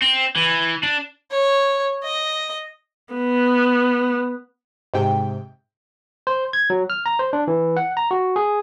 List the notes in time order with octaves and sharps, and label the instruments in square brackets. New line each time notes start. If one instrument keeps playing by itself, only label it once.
[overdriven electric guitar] C4
E3
D4
[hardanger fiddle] C#5
D#5
[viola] B3
[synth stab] G#2 C3 G5
[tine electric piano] C5
G#6
F#3
F6
A#5
C5
D4
E3
F#5
A#5
F#4
G#4